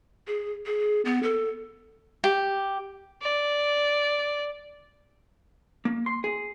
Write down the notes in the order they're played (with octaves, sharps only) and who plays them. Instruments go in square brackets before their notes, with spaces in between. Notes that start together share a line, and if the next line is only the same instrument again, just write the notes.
[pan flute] G#4
G#4
B3
A4
[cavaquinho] G4
[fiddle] D5
[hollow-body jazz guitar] A#3
C6
G#4